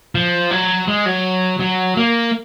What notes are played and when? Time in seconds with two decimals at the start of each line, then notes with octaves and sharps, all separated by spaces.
0.15 F3
0.51 F#3
0.88 G#3
1.06 F#3
1.60 F#3
1.97 A#3